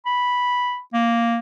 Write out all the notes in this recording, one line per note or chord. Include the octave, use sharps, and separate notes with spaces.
B5
A#3